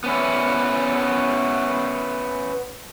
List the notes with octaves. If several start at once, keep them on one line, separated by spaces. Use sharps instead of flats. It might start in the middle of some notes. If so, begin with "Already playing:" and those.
B3 C#4 E4